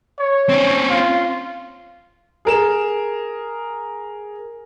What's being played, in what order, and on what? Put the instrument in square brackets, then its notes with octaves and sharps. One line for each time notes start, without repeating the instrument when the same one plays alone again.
[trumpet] C#5
[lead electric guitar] C4 C#4
[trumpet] F4
[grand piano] G#4 A#4 E7